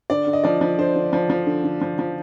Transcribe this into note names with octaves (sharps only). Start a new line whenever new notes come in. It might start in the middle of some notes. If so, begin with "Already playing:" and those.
D3 D5
D3
D#5
F3 D5
F3
D3 C5
D3
F3
F3
D3
D3
F3
F3